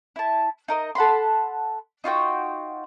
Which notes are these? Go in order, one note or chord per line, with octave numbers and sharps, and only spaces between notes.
E4 A5
D#4 A#4 D#5
A4 F#5 B5 C6
D#4 F4 F#4 G5